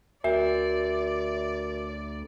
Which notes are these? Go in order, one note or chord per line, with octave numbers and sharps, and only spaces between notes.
D2 F#4 A#4 D5 E5